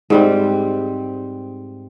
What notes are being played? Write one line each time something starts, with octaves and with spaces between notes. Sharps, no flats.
G#2 G3 C4